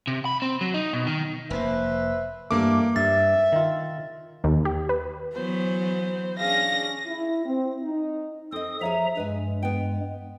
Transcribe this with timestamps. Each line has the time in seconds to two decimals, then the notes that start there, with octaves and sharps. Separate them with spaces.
0.07 C3
0.25 B5
0.42 C4
0.61 F#3
0.74 D#4
0.93 B2
1.07 D#3
1.50 F1 A#3 B4 C5 E5
2.51 G2 E3 A3 A#3 D6
2.96 G2 E5 A6
3.52 D#3 F4
4.44 D#2
4.65 G4
4.89 B4
5.35 E3 F#3 B3 C5
6.39 C#4 D4 G#4 F5 A#6
7.07 E4
7.45 C4
7.82 D#4
8.52 C4 A4 D#5 D#6
8.81 F3 G#4 C#5 E5 F5 A#5
9.17 G2 G#3 B4 G#5
9.63 B3 G5